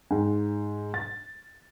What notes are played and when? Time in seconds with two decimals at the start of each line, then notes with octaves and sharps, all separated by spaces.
0.11 G#2
0.94 A6